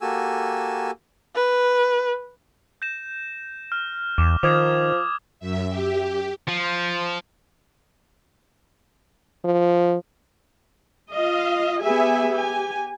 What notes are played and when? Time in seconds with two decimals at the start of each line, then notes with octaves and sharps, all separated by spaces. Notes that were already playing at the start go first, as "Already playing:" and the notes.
0.01 A#3 F#4 G4 A4 G#5 E6
1.35 B4
2.82 G6 A#6 E7
3.72 F6
4.18 E2 D6 E7
4.43 D#3 F3 D6 D#6 G#6
5.40 F#2 E5
5.69 G4
6.47 F3
9.45 F3
11.12 F4 D#5 F5
11.81 B3 G4 G#4 E5 G#5
12.32 G4 G#5